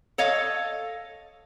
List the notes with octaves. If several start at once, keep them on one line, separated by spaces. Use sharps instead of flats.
A4 C#5 D#5 F5